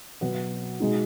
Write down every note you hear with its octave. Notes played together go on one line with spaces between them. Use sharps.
B2 F#3 B3
B2 G#3 D#4